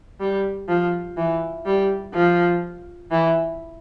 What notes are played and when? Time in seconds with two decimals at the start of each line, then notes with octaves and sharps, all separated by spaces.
0.20 G3
0.69 F3
1.17 E3
1.66 G3
2.14 F3
3.11 E3